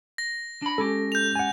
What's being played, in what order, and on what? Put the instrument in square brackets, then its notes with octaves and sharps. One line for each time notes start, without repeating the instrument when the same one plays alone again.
[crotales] A#6
[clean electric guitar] D4 B5
[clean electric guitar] G#3 C#4 G4 [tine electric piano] A4
[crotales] G6 F7
[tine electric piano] F#5 G#5